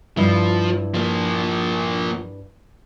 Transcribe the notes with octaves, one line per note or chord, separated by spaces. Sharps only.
G2 F3 E4
F3 A#3